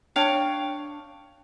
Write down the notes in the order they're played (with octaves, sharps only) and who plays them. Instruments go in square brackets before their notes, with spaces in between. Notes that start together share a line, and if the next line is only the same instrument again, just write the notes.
[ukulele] D4 C#5 F5 G5